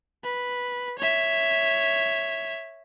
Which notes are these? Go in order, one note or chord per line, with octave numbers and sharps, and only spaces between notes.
B4
C#5 E5